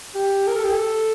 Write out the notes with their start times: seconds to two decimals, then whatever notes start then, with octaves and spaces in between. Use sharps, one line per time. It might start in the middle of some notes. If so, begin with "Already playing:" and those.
0.15 G4
0.48 A#4
0.56 A4
0.64 G4
0.72 A4